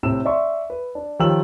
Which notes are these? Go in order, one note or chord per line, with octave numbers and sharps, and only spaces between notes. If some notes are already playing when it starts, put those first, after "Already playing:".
A2 C3 C4 E6 E7
D5 E5 C6 C#6
B4
D4
D#3 F3 G4 C#5 E6 F#7